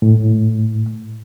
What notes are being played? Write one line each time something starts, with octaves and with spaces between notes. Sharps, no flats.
A2